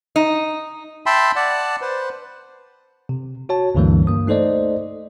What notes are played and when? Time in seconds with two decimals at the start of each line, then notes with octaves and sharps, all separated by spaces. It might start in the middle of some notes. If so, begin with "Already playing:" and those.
0.16 D#4
1.06 E5 G5 A5 B5 C6
1.36 D5 F#5 A5
1.81 B4 C5
3.09 C3
3.49 F#4 C#5 A5
3.75 D2 G2 D3 E3 G3 A#3
4.07 G2 A#3 D#6
4.27 A3 D#4 A4 C5 D5 D#5